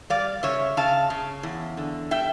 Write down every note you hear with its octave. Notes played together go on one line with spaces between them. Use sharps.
G3 D5 F5
C#3 C#5 E5
C#3 F5 A5
C#3
E2
D3
G3 E5 G5